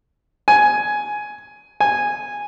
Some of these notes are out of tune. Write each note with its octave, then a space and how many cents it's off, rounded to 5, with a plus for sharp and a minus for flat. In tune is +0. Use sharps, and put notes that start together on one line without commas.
G#5 +10
G#5 -10